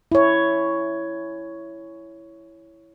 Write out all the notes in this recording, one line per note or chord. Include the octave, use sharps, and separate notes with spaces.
E4 C#5